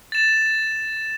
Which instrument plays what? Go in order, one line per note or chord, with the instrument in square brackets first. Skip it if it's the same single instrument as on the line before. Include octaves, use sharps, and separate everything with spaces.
[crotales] A6 E7